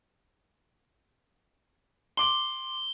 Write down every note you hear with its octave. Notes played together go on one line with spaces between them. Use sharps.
C6 D6 F#7 G7